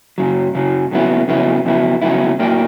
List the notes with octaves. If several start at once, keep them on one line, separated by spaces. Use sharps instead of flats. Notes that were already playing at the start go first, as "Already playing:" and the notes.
F#2 C#3 F#3
F#2 C#3 F#3
F2 C#3 F#3 B3 E4
F2 C#3 F#3 B3 E4
F2 C#3 F#3 B3 E4
F2 C#3 F#3 B3 E4
A2 F#3 A#3 D4 G4